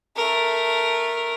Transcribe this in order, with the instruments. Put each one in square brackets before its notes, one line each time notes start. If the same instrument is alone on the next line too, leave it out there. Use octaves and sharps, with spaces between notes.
[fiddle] A3 A#4